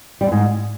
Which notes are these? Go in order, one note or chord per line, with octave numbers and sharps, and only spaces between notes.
G3
F#2
G#2